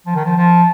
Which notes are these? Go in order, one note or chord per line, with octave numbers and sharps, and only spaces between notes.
F3
D#3
F3
F3